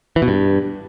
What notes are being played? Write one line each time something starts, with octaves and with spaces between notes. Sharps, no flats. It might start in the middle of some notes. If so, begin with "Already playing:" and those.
E3
B2
G2